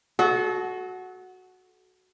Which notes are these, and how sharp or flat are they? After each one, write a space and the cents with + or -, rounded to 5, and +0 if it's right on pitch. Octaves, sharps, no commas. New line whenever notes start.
F#4 +0 A4 -35